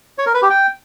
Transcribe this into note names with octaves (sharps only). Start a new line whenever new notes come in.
C#5
A#4
B4
G4
G5